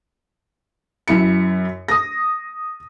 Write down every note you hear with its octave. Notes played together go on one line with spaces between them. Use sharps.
F#2 E4 C#7
D#6 A#6